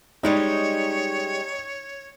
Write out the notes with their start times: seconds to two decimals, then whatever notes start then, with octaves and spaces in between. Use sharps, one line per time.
0.23 G3 G#3 C#4 D#4 C#5